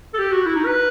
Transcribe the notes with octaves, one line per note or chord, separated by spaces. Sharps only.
A4
G4
F#4
E4
D#4
B4